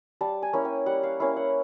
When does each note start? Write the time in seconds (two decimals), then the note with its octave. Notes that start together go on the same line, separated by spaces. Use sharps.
0.21 G3 A5
0.42 G#5
0.53 A#3 C#4 E4
0.65 G5
0.86 G3 F#5
1.03 F5
1.20 A#3 C#4 E4 F5
1.37 F#5